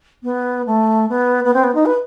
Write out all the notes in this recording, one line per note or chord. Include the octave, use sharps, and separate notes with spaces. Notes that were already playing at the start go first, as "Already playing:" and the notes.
B3
A3
B3
B3
C4
B3
D#4
B4